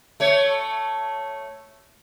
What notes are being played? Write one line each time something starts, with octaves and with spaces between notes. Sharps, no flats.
A3 C#5